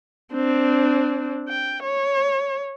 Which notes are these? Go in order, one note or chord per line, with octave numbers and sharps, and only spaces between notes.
C4 D4
G5
C#5